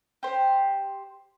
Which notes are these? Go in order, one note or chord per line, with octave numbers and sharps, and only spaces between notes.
G4 C5